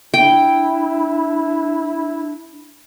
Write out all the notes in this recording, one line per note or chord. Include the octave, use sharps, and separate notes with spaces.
D4 E4 G5